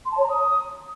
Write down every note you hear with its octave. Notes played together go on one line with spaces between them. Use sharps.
C6
A5
C#5
A#5
D#6